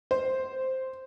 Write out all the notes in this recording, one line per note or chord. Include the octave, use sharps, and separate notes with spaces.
C5